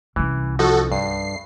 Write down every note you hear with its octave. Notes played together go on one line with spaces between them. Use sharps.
C2 E3 C#4
F3 D#4 F#4 A4
G2 C7